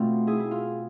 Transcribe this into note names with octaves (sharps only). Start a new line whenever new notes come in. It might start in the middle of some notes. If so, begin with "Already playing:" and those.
Already playing: B2 A3 C4 F4
E4 G#4
E4
F4